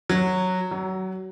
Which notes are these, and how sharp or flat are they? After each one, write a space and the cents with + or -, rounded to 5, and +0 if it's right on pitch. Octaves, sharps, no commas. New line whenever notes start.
F#3 -5
F#3 +25